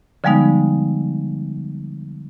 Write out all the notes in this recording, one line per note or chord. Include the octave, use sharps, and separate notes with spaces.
D3 F3 G3 G#3 B3 D#4